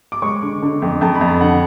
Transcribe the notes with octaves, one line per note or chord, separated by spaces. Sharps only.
D6
G#3 C#6
D3
D3
F2
F2 A5
B5
F2
A5
D3 F#5